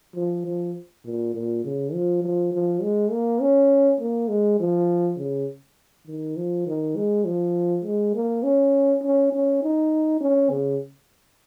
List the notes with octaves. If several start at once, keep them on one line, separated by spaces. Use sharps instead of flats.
F3
F3
A#2
A#2
C#3
F3
F3
F3
G#3
A#3
C#4
A#3
G#3
F3
C#3
D#3
F3
D#3
G#3
F3
G#3
A#3
C#4
C#4
C#4
D#4
C#4
C#3